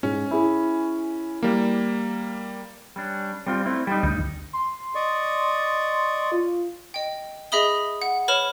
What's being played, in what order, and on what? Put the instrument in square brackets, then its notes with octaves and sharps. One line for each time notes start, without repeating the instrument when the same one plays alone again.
[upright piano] G#2 [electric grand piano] C#4
[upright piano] E4 G#4
[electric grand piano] G3 A#3
[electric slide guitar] G3 C#4 D4
G3 C4 F4
A3 C4 E4
G3 D#4
[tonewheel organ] D2 [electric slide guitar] G2 D#4
[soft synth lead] C6
[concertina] D5 D#5 C#6
[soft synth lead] F4
[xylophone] D#5 G5
G#4 D#5 E5 B5 D#6 G7
F#5
B4 C#5 B5 F6 E7